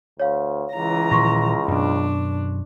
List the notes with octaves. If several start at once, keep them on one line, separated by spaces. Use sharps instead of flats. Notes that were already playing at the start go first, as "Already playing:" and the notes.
D2 C#5 F5
C#2 E3 A#5
A#2 D#3 F3 C6 C#6 A#6
F#2 B2 D4